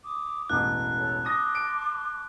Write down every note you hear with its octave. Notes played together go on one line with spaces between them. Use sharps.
D6 D#6
E1 A1 F#6
A4 C#5
A5 C6 D6 D#6 A#6
D7